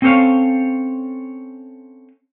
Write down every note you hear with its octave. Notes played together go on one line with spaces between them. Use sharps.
C4 C#4 A4 C5 C#5 F5